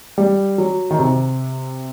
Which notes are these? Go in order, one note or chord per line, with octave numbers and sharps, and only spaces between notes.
G3
F#3
D#3
C3